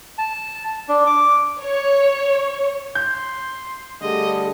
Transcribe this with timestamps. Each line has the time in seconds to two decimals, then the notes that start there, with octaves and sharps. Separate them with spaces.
0.18 A5
0.89 D4
1.06 D6
1.61 C#5
2.95 C6 G6
4.01 D3 G3 A3 G#4 D#5